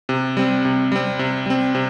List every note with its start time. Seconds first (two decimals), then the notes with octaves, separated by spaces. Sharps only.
0.09 C3
0.37 G3 C4
0.65 C3
0.92 G3 C4
1.19 C3
1.46 G3 C4
1.75 C3